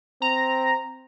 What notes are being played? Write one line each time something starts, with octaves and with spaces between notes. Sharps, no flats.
C4 A#5